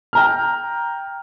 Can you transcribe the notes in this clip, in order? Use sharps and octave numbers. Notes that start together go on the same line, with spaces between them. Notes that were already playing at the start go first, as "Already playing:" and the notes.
G5 A#5 F6